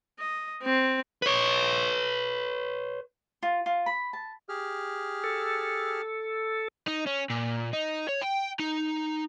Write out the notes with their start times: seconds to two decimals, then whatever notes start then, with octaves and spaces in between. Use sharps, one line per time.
0.19 D#5
0.63 C4
1.22 B4 C#5
3.43 F4
3.66 F4
3.86 B5
4.13 A5
4.49 G4 G#4 F6
5.24 A4
6.88 D#4
7.07 C#4
7.30 A#2
7.73 D#4
8.08 C#5
8.22 G5
8.60 D#4